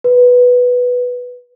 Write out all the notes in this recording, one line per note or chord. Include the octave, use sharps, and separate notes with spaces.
B4